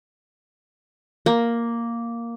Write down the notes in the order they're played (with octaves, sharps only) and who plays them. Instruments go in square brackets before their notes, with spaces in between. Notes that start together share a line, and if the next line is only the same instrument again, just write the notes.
[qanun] A#3